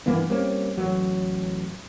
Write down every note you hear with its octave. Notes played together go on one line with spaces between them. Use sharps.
G2 E3 A#3 B3
G3 A#3 C4 C#4
A1 F#3